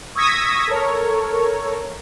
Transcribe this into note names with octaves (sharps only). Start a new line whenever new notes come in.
C#6 D#6 E6 G#6 A#6 B6
A4 A#4 C#5